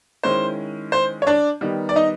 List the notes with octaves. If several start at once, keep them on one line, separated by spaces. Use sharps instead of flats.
D#3 G#3 C#4 E4 C5
C5
C#5
D4 D5
D#3 G3 B3 D#4
D5
D#4 D#5